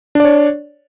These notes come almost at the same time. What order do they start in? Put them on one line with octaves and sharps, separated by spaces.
D4 D5 C#5